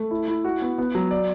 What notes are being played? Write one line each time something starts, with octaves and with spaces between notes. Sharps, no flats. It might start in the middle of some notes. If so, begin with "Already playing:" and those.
Already playing: A3
E4
E4
F#4
B3
B3
F#3
D5